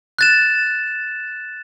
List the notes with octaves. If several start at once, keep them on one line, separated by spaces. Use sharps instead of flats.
F#6 A6 E7